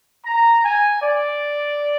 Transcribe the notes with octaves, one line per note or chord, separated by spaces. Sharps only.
A#5
G#5
D5